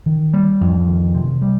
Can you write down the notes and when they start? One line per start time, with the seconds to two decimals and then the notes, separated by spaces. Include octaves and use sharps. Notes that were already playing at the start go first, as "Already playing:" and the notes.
0.06 D#3
0.34 G3
0.61 F2
0.87 D#3
1.15 C3
1.42 G3